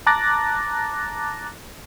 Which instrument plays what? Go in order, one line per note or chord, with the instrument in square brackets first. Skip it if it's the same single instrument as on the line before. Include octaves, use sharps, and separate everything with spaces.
[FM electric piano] A5 A#5 D6 F#6 A6 A#6